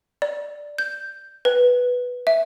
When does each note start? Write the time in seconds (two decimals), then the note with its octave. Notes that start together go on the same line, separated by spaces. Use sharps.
0.22 D5
0.78 G6
1.45 B4
2.27 E5